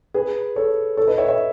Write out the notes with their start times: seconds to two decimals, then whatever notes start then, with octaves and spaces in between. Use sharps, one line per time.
0.14 G#4 B4
0.56 A4 C#5
0.97 A4 C#5
1.08 B4 D#5
1.18 C#5 E5
1.28 C#5 E5